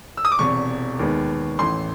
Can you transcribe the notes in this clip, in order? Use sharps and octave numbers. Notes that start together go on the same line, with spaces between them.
E6
D#6
D6
E1 E2 C3 C#6
D#2 D#3 G#3 B3
A1 A2 E3 C6